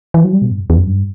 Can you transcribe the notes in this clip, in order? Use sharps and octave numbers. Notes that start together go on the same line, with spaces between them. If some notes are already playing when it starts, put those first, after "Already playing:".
E3
F#3
G3
B2
G2
F#2
E2
F#2
G2